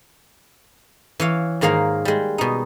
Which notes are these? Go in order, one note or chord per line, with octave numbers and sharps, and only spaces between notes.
E3 C#5 F5
G#2 D#3 A#3 G#4 F5 A#5
G3 G#3
B2 D#4